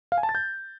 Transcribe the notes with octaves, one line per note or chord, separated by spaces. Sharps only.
F5
G#5
A5
A6
G6